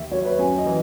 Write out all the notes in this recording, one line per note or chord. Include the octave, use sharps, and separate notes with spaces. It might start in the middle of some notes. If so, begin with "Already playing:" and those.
Already playing: D#2 E5
F#3 C#5
B4
F#2 G#5
D#5
E3